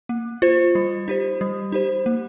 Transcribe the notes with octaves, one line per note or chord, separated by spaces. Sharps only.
A#3
F4 C5
G3
D#4 G4 C5
G3
D#4 G4 C5
A#3